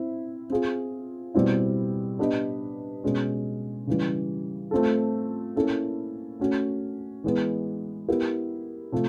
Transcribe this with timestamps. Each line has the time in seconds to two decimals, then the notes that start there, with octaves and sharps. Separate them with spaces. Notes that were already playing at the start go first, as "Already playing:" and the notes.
Already playing: C4 E4 E5
0.50 C4 F4 G#4
1.35 B2 G3 C4 E4
2.19 B3 D4 G4 B4 D#5
3.04 B2 G#3 C#4
3.87 C#3 E3 G3
4.71 A3 C4 F4 A4
5.56 A#3 C#4 E4 A4
6.40 A3 C#4 F#4
7.24 E3 G#3 B3
8.08 B3 E4 G4 A#4
8.92 C3 F3 A3